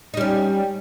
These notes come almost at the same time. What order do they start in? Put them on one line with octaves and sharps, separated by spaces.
D#4 G3 C#4